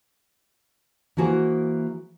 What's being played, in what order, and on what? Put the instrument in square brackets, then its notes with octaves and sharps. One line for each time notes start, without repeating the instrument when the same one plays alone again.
[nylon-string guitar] E3 A#3 F#4 G#4 C5